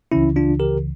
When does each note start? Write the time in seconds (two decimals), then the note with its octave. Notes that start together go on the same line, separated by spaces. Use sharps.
0.12 C#2 C#3 E3 C#4 E4
0.36 D4 F4
0.60 G4 A#4